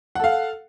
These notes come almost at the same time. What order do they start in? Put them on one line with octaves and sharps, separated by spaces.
F#5 A4 F5